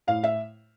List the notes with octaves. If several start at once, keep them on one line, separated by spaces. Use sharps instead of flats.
A2 F5
E5